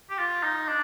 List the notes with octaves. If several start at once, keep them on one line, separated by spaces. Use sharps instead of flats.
G4
F4
D#4
D4